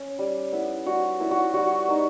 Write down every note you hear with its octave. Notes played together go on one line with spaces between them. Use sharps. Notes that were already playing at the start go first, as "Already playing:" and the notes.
Already playing: C#4
G3
B3 E4
G3 F#4
B3 E4
F#4
G3 F#4
B3 D#4